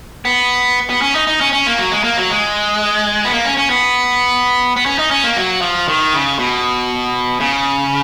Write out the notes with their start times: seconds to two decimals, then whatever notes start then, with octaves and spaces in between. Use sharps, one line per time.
0.25 B3
0.90 B3
1.02 C#4
1.15 D#4
1.27 D#4
1.41 C#4
1.53 C#4
1.67 A#3
1.78 F#3
1.91 G#3
2.04 A#3
2.17 F#3
2.30 G#3
3.25 B3
3.32 A#3
3.45 C#4
3.57 C#4
3.70 B3
4.76 B3
4.86 C#4
4.99 D#4
5.11 C#4
5.24 A#3
5.36 F#3
5.61 F3
5.88 D#3
6.13 C#3
6.39 B2
7.40 C#3